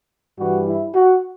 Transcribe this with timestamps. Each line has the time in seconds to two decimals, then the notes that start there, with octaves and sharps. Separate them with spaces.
0.38 G2 E3 G3 F#4
0.66 E4
0.94 F#4